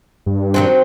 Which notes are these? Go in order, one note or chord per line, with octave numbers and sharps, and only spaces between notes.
G2
D#3 F#3 C4